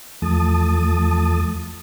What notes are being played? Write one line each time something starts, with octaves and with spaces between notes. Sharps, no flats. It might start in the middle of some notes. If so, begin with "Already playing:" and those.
E2 F3 A3 A5 D#6